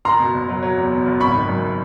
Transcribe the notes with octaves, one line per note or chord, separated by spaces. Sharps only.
F#1 A#5 C6
B2
F#1
F#3
F#3
E2
B2
F#1
G#1 B5 C#6
D#3
F#2